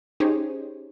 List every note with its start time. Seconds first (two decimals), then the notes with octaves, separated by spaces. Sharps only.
0.20 C#4 D#4 G4 G#4 C5 C#5